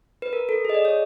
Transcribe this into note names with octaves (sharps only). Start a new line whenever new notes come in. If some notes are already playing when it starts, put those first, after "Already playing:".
B4
A#4
A4
G#4
D#5
D5
C#5